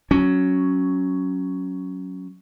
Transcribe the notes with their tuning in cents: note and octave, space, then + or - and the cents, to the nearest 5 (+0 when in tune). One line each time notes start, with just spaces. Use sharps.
F#3 +5 C#4 +0